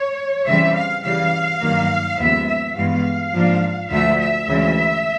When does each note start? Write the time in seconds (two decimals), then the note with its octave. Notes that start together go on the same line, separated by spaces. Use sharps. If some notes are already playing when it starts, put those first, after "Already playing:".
Already playing: C#5
0.47 C#3 E3 G3 C4 E5
0.76 F5
1.05 C#3 E3 G3 F5
1.62 G2 D#3 F#3 A#3
2.19 D#2 C#3 F3 G#3 B3 E5
2.47 E5
2.77 G2 E3 G#3 B3 F5
3.34 G#2 F3 A#3 D4
3.91 D2 D3 F3 A3 E5
4.20 E5
4.49 D2 C#3 E3 G#3